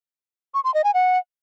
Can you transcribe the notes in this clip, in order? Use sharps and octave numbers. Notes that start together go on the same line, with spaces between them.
C#6
C6
D#5
G#5
F#5